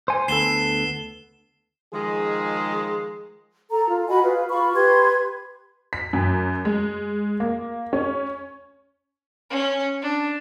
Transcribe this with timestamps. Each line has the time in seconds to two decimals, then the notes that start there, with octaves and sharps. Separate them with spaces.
0.08 C5 G#5
0.28 D2 B3 A4 C7 E7 G7
1.93 D#3 F3 G#3 G#4
3.71 A4 A#5
3.89 F4
4.08 F#4 D#5 G#5 B5
4.22 F4 G#4 B4
4.49 F4 B5 C#6
4.74 G4 B4 C6 G#6
5.93 B6
6.13 F#2
6.65 G#3
7.40 A#3
7.93 C#4
9.50 C#4
10.02 D4